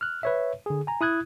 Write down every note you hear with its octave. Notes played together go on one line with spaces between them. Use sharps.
F6 F#6
B4 C#5 E5
D3 G#4
G#5 A#5
E4 D#6 F#6 G#6